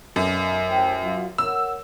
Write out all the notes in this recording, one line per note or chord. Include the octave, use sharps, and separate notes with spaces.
B1 F#2
A1 C5 G5
F#3 F4 F#4
A#4 C#5 F#5 E6